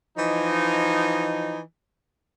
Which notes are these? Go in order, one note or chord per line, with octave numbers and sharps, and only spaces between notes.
E3 F3 D#4